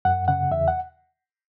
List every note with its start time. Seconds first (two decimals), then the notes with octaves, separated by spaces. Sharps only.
0.05 F#2 F#5
0.28 C#3 F#5
0.51 E2 E5
0.68 F#5